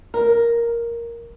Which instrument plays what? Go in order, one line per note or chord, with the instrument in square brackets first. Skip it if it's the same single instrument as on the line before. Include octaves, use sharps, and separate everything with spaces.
[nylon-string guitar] A#4